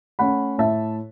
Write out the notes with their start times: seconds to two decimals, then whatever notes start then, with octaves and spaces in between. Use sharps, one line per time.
0.19 A3 C#4 F#5 B5
0.58 A2 E5 A5